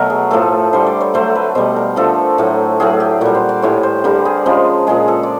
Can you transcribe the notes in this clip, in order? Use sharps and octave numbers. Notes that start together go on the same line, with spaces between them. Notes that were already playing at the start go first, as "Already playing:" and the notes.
Already playing: B2 F#3 A3 A#4
G#4
A2 F3 A3 A4
D3 G3 C5
D5
C#5
D3 F#3 A3 C5
B4
B2 G3 C5
A#4
D3 F3 A3 A4
A2 F#3 A3
A2 F#3 A3 G#4
G4
A#2 G3 F#4
C5
D5
A2 E3 G3 C#5
C5
D3 G3 A#4
G#4
C#3 F3 G#3
A#2 F3 G#3 G#4
A4
D5